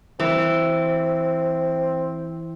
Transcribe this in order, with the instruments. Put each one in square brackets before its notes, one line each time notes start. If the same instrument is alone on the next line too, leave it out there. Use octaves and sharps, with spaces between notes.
[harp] E3 [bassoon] C4